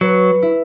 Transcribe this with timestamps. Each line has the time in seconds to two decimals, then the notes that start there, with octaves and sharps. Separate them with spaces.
0.01 F#3 B4
0.42 E4